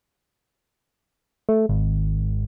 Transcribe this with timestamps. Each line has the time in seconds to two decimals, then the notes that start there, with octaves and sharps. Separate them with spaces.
1.49 A3
1.69 G#1